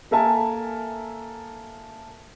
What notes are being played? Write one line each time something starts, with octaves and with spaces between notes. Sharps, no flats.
A#3 A4 A#4 E5 G#5 A5